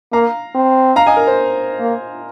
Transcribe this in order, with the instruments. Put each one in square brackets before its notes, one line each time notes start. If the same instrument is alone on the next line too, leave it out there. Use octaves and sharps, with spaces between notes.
[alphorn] A#3 [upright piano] F5 A#5
[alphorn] C4
[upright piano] F5 A#5
D#5 G#5
A#4
C5
[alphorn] A#3